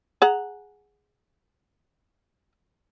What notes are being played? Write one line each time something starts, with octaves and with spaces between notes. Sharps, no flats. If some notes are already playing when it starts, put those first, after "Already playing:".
G#4 F#5 A#5